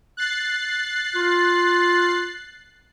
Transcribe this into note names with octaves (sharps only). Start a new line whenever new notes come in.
F#6 A6 C7
F4